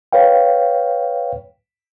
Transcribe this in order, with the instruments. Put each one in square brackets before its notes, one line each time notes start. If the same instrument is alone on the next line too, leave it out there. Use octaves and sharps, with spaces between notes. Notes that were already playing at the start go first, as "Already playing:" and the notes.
[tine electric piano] B4 C#5 F5 G5